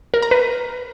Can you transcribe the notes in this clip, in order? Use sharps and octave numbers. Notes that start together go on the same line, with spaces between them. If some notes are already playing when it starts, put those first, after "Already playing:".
A#4
A#5
B4